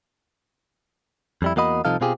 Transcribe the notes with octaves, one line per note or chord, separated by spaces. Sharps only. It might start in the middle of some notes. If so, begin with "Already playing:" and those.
F2 G3 E4
E2 A#3 F#4 D#5 B5
C2 C3 F3 D#4 A4 F5
B2 C4 F4 G4 G#4